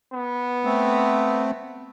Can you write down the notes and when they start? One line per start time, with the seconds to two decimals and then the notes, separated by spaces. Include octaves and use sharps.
0.13 B3
0.65 A3 C4